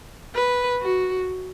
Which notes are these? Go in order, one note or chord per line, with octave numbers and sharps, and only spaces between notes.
B4
F#4